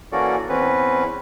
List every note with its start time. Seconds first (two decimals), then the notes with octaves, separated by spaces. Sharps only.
0.12 E3 A#3 C#4 F#4 A4 D5
0.49 E2 C4 C#4 B4